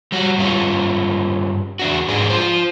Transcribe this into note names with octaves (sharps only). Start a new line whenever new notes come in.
G3 F#4
G2 C#4 F4
E2 D4 F#4
G#2 D4 G#4
F4 C5